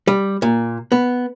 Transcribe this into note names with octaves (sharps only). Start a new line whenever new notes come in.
G3
A#2
B3